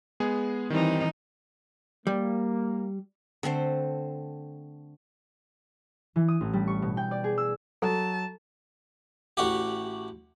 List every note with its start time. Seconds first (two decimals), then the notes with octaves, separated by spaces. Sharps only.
0.20 G#3 B3 G#4
0.70 D#3 E3 G3 C4 D#4
2.07 G3 A#3
3.43 D3 A3 C4 C5
6.16 E3
6.28 D#6
6.41 A1
6.53 G3
6.68 C#6
6.82 B2
6.97 G5
7.11 D5
7.24 G#4
7.38 E6
7.82 F#3 A4 A5
9.37 A1 F#4 G4